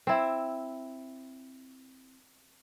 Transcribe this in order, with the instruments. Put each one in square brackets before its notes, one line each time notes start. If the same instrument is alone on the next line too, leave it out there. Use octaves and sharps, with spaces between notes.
[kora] C4 E4